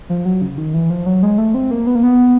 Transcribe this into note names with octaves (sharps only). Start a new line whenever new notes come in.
F3
F#3
C#3
D#3
E3
F3
F#3
G#3
A3
C4
A#3
B3
A#3
B3